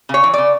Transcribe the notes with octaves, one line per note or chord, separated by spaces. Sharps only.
C#3 C#5
E3
C#3 D5